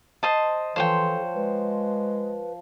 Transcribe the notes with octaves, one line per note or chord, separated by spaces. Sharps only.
C5 D#5 A5
E3 F3 A4 C5 C#5 G5
G#3 B4